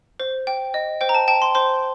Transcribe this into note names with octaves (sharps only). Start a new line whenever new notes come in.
C5
G5
D#5
C5 G5
A#5
A5
G5 A5
C6
C5 C6